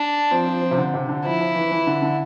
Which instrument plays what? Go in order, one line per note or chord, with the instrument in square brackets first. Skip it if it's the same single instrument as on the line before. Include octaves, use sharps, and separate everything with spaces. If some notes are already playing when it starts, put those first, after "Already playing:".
Already playing: [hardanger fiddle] D4
[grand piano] F3 [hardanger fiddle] C4
[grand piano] F3
F3
C3
D3
C3
D3
[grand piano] F3 [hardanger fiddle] E4
[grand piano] F3
E3
E3
D3
D3